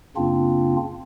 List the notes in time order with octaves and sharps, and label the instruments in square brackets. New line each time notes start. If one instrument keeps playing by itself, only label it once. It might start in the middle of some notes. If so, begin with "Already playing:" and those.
[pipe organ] F#2 C#3 A#3 C4 D4 F4